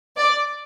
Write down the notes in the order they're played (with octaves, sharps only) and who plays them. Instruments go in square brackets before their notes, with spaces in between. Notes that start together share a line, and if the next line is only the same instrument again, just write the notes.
[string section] D5